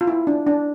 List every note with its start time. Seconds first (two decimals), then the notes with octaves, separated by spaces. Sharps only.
0.01 F4
0.07 E4
0.27 D4
0.47 D4